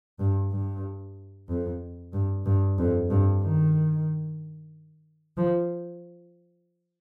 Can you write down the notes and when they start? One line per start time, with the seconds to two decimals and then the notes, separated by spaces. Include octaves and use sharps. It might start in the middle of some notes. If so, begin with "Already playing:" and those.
0.19 G2
0.51 G2
1.48 F2
2.13 G2
2.46 G2
2.78 F2
3.10 G2
3.43 D#3
5.37 F3